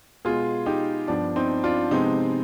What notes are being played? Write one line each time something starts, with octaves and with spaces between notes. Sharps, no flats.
B2 G#3 B3 F4 G#4
D#4 G4
G2 F3 B3 D4
C4 D#4
D4 F4
C3 F3 G#3 B3 C4 D#4